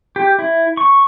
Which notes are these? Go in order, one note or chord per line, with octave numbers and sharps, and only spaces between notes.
G4
E4
C#6